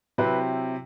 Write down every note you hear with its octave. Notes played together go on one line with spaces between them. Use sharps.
C3 F#3 C4 E4 B4